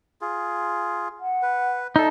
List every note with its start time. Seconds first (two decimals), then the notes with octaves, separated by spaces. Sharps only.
0.21 F4 G#4
1.20 F#5
1.42 B4
1.96 D#4 A4 D5 E5